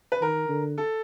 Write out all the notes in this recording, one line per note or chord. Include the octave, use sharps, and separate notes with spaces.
B4
D#3 A#4
D3
A4